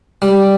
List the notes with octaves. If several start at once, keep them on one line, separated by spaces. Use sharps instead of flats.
G3